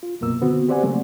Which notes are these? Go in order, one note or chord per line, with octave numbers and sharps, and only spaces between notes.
F4
C2 F#2 B2 A#3 E6
D3 D#3 B3 C4 F#4
G4 C5 D5 F#5 G#5
C#3 F#3 A3 A#3 C4